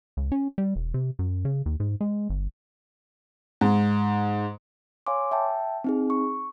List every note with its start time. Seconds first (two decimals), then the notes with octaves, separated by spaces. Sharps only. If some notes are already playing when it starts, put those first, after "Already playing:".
0.17 C#2
0.32 C#4
0.58 G3
0.76 E1
0.94 C3
1.19 F#2
1.45 C#3
1.66 D#2
1.80 G#2
2.01 G#3
2.30 G1
3.61 G#2
5.07 C#5 F5 G#5 C6 D6
5.31 E5 G5 A5
5.84 C4 D#4 G#4
6.10 C#6